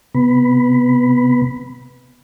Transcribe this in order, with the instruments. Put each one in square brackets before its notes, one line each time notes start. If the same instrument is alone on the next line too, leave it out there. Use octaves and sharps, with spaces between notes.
[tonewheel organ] C3 B3 B5